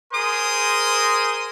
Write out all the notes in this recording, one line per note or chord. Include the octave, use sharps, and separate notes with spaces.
G#4 A#4 C5 C6 D#6